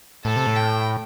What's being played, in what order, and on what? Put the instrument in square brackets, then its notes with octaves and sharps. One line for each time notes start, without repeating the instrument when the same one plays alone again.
[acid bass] A2 [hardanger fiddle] A4
[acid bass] C3
A2
[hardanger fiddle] G5